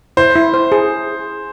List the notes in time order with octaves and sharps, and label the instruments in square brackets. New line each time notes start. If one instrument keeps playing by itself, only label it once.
[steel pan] E4 [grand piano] C5
[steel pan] E4
C5
G#4